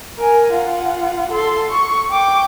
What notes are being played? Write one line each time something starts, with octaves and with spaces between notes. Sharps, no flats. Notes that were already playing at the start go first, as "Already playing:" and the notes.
A#4 G#5
F4 F#5
A4 C6
C#6
G5 D6